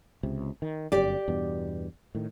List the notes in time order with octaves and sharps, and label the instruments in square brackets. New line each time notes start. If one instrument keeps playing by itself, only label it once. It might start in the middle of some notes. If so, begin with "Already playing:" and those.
[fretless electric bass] C#2 C3
D#3
[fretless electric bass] G1 F#2 [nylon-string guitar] G4 D5
[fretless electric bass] E2 G2 B2
A2 D#3